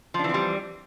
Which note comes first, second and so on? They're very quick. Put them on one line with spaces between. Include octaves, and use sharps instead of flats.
F3 D4 E3 C4 G3